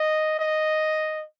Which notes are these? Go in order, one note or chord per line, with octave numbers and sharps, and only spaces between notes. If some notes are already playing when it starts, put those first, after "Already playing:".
Already playing: D#5
D#5